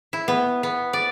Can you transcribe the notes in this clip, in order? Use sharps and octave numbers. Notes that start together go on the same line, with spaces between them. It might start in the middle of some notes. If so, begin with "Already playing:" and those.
E4
B3
B3
D5